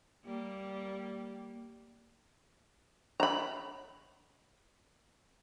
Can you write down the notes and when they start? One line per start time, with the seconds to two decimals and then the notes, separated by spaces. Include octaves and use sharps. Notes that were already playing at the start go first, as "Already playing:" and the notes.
0.25 G3 A#3
3.20 A#5 B5